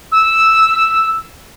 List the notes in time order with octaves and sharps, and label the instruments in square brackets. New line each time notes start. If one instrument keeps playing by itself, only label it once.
[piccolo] E6